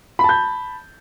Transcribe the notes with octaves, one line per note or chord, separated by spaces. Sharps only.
A5 B5 G6